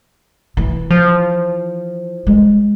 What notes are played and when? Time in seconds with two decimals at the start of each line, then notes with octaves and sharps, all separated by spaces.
0.57 E3
0.91 F3
2.27 G#3